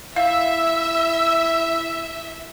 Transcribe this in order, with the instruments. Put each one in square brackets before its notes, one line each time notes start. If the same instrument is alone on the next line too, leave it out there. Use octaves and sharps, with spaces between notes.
[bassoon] E4 [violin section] E5 [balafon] F5 [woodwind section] E6